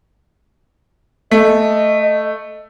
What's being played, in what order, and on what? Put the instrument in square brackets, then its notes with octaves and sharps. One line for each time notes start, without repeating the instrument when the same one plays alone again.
[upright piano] A3 [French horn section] D#5